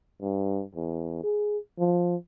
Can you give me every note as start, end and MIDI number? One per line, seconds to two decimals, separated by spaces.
0.22 0.63 43
0.75 1.20 40
1.23 1.58 68
1.79 2.16 53